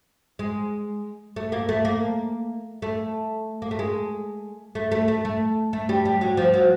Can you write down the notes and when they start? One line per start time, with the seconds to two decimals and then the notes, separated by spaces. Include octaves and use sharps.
0.39 G#3
1.36 A3
1.52 A#3
1.69 A3
1.85 A#3
2.82 A3
3.62 A#3
3.71 A3
3.79 G#3
4.75 A3
4.92 A3
5.08 A3
5.25 A3
5.73 A3
5.89 G3
6.05 G3
6.21 F#3
6.37 F3
6.54 F#3